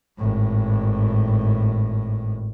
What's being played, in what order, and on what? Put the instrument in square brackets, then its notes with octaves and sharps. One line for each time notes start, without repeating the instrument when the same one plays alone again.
[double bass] G#1 A2